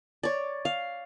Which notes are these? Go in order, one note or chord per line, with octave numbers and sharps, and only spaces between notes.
C#5 D5
F5